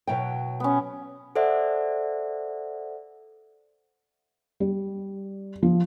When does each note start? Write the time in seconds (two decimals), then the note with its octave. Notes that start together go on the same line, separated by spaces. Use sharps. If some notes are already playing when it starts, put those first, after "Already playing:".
0.07 B2 F#3 G5
0.60 B3 C#4
1.36 A4 C5 D5 E5 F#5
4.60 G3
5.63 F3